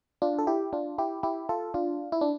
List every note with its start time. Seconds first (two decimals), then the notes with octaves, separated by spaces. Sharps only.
0.22 D4 F4
0.39 A4
0.47 E4 G4
0.73 D4 F4
0.98 E4 G4
1.23 E4 G4
1.49 F4 A4
1.74 D4 F4
2.12 E4
2.21 D4